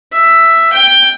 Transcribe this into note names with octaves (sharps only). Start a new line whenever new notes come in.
E5
G5